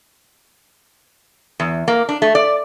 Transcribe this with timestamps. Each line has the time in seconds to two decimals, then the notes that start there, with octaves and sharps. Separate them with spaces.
1.60 E2
1.88 A#3
2.09 D4
2.22 A3
2.35 D5